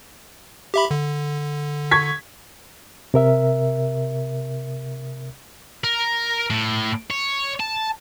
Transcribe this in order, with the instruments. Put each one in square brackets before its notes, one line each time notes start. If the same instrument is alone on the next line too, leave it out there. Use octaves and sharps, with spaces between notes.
[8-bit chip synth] G4 E5 B5
D3
[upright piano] C#6 G#6 B6
[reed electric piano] C3 A#4 E5
[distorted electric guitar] A#4
A2
C#5
A5